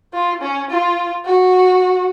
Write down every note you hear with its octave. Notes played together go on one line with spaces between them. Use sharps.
F4
C#4
F4
F#4